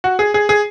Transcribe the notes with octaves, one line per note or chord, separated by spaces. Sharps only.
F#4
G#4
G#4
G#4